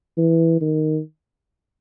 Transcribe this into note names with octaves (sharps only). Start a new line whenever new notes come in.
E3
D#3